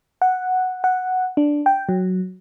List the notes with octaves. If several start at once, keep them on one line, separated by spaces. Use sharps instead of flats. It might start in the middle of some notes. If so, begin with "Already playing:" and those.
F#5
F#5
D4
G5
F#3